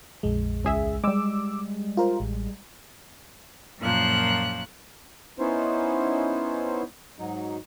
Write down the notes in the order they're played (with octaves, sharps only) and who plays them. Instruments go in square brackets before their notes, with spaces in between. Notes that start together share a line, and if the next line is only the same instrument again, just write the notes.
[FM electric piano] A#1 F2 G#3
[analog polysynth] C#2 G#4 E5
[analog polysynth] G3 G#3 [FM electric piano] D6 E6
[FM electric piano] F4 A#4 C5
A1
[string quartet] F#2 A#2 F3 F#6
[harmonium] B3 C#4 D#4 E4 C5
G#2 F#3 D#4